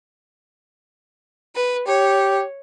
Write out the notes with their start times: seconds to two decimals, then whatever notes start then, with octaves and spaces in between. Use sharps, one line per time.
1.55 B4
1.87 G4 C#5